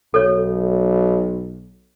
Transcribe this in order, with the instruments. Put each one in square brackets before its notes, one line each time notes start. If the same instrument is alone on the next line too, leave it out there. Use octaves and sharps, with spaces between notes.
[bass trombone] B1 [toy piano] A4 C#5